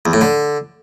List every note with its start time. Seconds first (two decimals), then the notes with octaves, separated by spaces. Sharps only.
0.06 E2
0.13 A2
0.21 D3